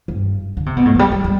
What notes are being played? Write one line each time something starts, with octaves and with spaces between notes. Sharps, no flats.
G2
D3
C3
B2
A2
F3
G3
G3
G3